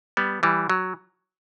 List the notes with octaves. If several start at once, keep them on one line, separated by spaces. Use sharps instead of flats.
G3 B3
E3 G3
F#3